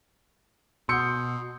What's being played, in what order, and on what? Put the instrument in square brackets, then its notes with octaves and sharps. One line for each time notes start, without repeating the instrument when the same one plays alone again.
[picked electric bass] B2 [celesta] F#5 D#6 E6 [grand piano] C6 G6 C#7